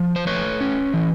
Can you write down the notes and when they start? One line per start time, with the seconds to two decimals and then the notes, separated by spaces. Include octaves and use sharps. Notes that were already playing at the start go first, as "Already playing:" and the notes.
Already playing: F3
0.16 C5
0.27 A3 B4 C#5
0.61 C#4
0.94 E3